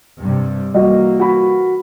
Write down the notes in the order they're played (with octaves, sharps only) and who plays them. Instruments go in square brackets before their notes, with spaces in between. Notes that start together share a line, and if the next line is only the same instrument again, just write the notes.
[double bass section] G2 C3 G3
[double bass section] E3 A#3 [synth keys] G3 [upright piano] F#4 D#5
[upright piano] F#4 B5